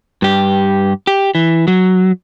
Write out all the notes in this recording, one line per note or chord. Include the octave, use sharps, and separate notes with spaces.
G2 G4
G4
E3
F#3